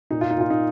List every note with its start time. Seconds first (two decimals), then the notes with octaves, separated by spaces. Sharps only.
0.11 A#2 D#4
0.21 F4
0.31 D#4
0.37 A#2 F4
0.50 D#4